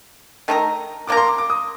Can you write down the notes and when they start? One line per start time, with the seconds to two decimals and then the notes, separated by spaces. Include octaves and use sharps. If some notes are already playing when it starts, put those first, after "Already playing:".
0.48 D#3 A3 D#4 A#4
1.07 F3 A#3 F4 A#4 D6
1.17 C6
1.27 D6
1.38 D6
1.50 D#6